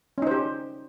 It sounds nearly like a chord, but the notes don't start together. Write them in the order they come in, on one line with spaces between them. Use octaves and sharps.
C#4 D#4 C5 G4